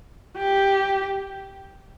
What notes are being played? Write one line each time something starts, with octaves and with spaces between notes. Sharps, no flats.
G4